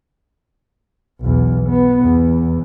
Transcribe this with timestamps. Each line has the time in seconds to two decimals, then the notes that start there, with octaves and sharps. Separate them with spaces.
1.21 B1 E2
1.69 B3
2.02 E2